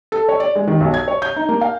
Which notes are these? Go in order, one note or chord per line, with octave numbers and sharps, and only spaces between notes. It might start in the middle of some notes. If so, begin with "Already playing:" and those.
A4
C#5
D5
G#3
D#3
B1
G#6
C#5
G6
D#4
A#3
F5